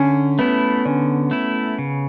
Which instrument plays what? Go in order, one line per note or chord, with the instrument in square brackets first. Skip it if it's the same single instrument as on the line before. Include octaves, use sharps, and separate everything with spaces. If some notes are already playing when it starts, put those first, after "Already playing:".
Already playing: [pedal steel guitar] D3 [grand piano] C#4
[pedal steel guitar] A3 E4 [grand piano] B3
[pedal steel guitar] D3 [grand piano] C#4
[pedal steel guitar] A3 E4
C#3